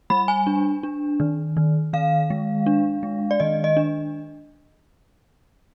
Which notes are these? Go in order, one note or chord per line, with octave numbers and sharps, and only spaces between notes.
G3 B5
G#5
D4
D4
D#3
D#3
D#3 F5
G#3
D4
G#3
D5
D#3 D#5
D#5
D4